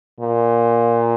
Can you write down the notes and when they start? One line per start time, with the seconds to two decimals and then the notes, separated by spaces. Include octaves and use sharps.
0.21 A#2